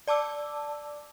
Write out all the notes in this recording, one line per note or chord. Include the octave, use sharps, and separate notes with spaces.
D5 A5 D6 E6